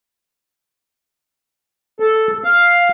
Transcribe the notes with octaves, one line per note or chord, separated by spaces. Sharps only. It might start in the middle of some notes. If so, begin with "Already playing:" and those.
A4
F5